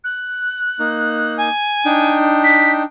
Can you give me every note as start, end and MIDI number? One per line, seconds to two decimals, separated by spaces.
0.04 1.33 90
0.79 1.49 58
0.79 1.49 63
1.37 2.15 80
1.85 2.83 62
1.85 2.83 63
1.85 2.83 79
2.43 2.71 95